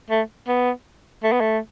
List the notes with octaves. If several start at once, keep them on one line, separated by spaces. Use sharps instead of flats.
A3
B3
A3
B3
A3